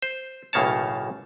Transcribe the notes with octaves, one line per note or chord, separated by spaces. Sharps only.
C5
B1 A2 C#3 A#3 C#5 A5